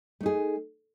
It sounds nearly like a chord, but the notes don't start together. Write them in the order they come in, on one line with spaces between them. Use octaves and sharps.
A3 D#4 G#4